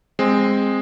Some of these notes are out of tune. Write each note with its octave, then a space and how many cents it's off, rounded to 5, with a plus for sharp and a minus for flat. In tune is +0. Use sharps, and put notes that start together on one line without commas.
G#3 -15 C4 +0